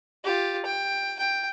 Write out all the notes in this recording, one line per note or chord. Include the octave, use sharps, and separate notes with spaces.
F4 G4
G5
G5